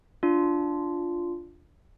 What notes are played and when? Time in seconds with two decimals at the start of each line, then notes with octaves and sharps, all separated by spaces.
0.23 D4 F4